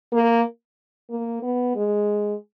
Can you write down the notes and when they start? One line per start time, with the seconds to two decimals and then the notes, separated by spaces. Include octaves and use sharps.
0.12 A#3
1.10 A#3
1.42 B3
1.76 G#3